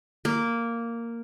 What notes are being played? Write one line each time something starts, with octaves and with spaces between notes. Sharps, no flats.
A#3